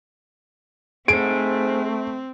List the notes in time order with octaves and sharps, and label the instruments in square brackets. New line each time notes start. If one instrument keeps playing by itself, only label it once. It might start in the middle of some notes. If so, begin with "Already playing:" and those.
[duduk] A3 [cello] C4 [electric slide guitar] G#4 C5 [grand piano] D7